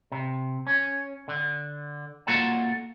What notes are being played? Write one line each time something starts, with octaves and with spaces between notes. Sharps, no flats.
C3
C#4
D3
A#3 F4 F#4 A4 F#5 A5